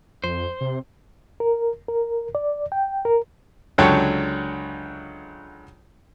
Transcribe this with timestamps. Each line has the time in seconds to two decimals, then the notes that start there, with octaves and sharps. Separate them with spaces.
0.24 F2 C5
0.61 C3
1.40 A#4
1.89 A#4
2.35 D5
2.72 G5
3.05 A#4
3.78 C#2 D3 F#3 C#5 G5 A5